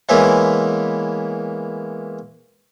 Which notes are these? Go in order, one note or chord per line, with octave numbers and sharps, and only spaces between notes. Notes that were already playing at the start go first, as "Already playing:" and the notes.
E3 G#3 A#3 B3 C#4 E4